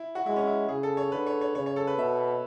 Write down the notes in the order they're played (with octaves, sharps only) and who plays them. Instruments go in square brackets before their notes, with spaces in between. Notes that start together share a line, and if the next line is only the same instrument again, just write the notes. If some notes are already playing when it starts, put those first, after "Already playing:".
Already playing: [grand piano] E4
F#4
[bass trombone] G#3 [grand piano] E4
[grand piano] C#4
E4
[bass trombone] C#3 [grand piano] G#4
[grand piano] A4
C#5
[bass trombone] D3 [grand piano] B4
[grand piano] C#5
C#5
[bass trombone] C#3 [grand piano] C#5
[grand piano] C#5
A4
B4
[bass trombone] B2 [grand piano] E5